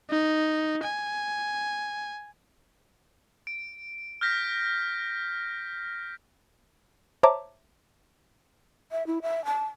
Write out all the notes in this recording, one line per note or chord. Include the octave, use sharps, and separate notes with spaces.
D#4
G#5
D7
F6 G6 A#6 B6
C5 C#5 E5 A5 A#5 D6
E5
E4
E5
A5